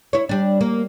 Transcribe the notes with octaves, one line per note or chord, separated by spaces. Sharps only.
E4 C#5
G3 D4
A#3